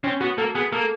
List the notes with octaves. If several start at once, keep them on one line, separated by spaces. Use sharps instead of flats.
C4 C#4
B3 F#4
A#3 A4
B3 G#4
A#3 A4